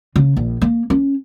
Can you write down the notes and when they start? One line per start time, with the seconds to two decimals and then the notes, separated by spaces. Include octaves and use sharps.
0.16 C#3
0.36 A#1
0.61 A#3
0.90 C#4